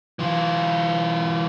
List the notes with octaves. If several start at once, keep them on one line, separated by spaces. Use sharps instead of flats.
E3 F4